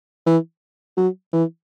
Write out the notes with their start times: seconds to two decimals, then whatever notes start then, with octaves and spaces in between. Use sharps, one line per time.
0.26 E3
0.97 F#3
1.33 E3